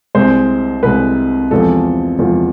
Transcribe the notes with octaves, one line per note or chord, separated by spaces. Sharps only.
C2 C3 G#3 C5
C2 C3 G#3 B4
E2 C3 F3 G#3 A4
E2 C3 F3 G#3 F4